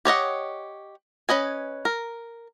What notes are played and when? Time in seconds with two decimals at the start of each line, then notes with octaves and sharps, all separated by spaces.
0.05 G4 C#5 D#5 F#5
1.29 C#4 B4 D#5 G#5
1.85 A#4